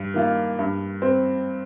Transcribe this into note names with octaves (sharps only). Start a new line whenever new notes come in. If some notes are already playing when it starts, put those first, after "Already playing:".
Already playing: G2
D#3 A#3 F4
G2
C4